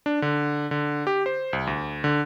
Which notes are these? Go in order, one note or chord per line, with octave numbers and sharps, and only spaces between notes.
D4
D3
D3
G4
C5
C2
D2
D3